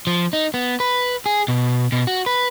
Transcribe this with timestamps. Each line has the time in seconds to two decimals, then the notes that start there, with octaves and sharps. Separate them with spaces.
0.07 F3
0.33 D#4
0.54 B3
0.80 B4
1.26 G#4
1.48 B2
1.92 B2
2.07 F#4
2.26 B4